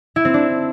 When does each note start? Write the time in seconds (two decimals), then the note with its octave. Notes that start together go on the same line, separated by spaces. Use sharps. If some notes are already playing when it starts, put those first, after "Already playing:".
0.16 E4
0.25 C4
0.34 D4